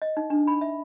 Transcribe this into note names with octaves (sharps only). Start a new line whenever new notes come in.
D#5
D#4
D4
B5
E5